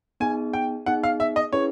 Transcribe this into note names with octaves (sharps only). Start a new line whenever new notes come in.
B3 D#4 G#4 G#5
G5
B3 D#4 G#4 F#5
F5
E5
D#5
C#4 E4 G#4 B4 C#5